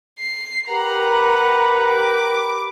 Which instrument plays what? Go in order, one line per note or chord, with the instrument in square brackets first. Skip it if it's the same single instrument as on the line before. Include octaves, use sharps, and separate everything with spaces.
[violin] C7
[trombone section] G4 A#4 [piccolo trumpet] B4 [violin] F#5 A#5
[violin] D6